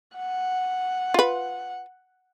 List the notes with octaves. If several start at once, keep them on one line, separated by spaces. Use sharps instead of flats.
F#5
F4 B4